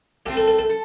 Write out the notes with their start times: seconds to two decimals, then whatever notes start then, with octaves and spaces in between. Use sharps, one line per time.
0.25 A2 A3 C4 G4
0.37 A4
0.48 A4
0.59 A4
0.69 A4